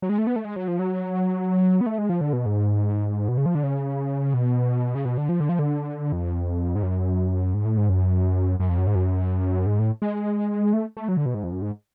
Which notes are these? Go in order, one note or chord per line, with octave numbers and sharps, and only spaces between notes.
F#3
G#3
A3
B3
A3
G#3
F#3
F3
F#3
B3
A3
G#3
F3
D3
B2
G#2
B2
C#3
F3
D3
C#3
B2
C#3
B2
D3
F3
D3
F3
D3
F2
G#2
F#2
G#2
A2
G#2
F#2
F#2
F2
F#2
G#2
F#2
G#2
A2
G#3
A3
A3
F#3
D3
B2
G#2
F2
F#2
G#2